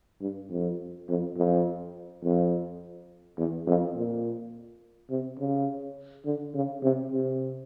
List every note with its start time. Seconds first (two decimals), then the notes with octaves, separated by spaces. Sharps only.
0.21 G2
0.50 F2
1.08 F2
1.36 F2
2.23 F2
3.38 E2
3.67 F2
3.95 A#2
5.10 C3
5.39 C#3
6.25 D3
6.54 C#3
6.83 C3
7.12 C3